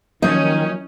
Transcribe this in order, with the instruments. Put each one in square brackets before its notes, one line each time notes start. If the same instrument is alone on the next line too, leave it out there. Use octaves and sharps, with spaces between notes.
[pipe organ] D#3 [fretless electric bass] F3 F#3 A#3 [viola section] C#4 [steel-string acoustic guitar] D#4